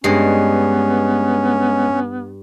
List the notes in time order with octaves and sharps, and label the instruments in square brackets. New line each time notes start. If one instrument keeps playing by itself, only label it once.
[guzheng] G2 [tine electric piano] G#3 D#5 C7 [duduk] B3 [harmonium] C#4